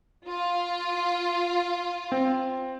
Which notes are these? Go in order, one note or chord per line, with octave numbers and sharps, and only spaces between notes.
F4
C4